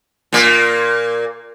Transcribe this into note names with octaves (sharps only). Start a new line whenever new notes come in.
A#2 A#3